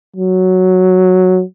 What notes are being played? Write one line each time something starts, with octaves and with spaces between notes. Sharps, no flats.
F#3